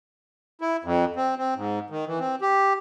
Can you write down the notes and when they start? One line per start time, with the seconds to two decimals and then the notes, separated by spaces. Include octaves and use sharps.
0.61 E4
0.84 F2
1.16 C4
1.38 C4
1.56 G#2
1.90 D#3
2.07 E3
2.19 C4
2.42 G4